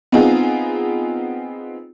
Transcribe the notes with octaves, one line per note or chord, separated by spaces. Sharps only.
B3 C4 D#4 F4 G#4